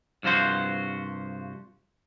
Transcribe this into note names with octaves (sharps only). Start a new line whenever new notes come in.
C2 G2 F3 F#4 C5